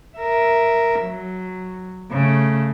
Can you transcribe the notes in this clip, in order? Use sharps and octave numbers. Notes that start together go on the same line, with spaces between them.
A#4 E5
F#3
C#3 A3